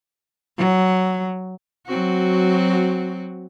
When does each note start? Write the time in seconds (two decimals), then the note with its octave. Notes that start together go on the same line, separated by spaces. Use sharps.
0.58 F#3
1.87 F#3 C4 F#4